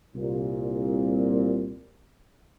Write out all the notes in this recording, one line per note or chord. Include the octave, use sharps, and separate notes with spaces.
C2 A#2